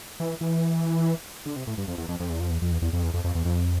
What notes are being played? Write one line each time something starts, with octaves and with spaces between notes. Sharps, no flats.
E3
E3
D3
C3
A2
G2
F2
E2
F2
F2
E2
F2
E2
F2
E2
E2
F2
E2
F2
F2
E2
F2